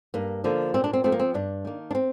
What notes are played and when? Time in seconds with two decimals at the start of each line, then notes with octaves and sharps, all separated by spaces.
0.14 G2 A#3
0.44 D3 F3 A#3
0.74 A#2 C4
0.84 D4
0.93 C4
1.04 F3 A3 C4
1.12 A#3
1.20 C4
1.34 G2 D4
1.65 D#3 A#3
1.91 D4
1.95 C4